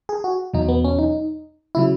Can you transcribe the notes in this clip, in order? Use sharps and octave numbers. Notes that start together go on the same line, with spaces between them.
G#4
F#4
E2 B2 F#3 D#4
B3
C#4
D#4
C#3 F#3 E4